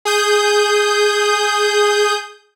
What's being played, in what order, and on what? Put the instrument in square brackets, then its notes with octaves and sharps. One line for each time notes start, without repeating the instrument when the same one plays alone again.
[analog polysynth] G#4 D#6 G6